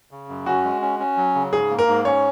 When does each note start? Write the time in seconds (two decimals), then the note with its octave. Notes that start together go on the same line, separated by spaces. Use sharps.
0.11 C#3
0.29 F#2
0.46 C#4 F#4
0.64 G#3
0.82 C#4
0.99 C#4
1.17 F#3
1.35 C#3
1.53 G#2 G#4
1.71 A#3
1.79 A#4
1.87 G#2
2.05 C#4 C#5